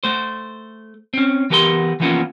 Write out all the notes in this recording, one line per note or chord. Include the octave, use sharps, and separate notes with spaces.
A3 C5
C4 C#4
E3 B3 G4 A#4 G#5 C6
E3 F3 A#3 B3 C#4 F4